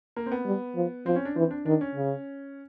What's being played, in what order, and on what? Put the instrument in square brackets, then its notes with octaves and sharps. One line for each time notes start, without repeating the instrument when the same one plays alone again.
[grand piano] A#3
C4
B3
[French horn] G3
F3
[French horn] F3 [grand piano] C4
[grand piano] C#4
D4
[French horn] E3 [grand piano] C4
[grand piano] D4
[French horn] D#3 [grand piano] D4
[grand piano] C#4
[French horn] C#3